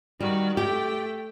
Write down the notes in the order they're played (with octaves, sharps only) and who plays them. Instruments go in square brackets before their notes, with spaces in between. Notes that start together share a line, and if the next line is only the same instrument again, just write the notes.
[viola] D#3 F#4 [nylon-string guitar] G3
[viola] A3 G5 [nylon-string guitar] G4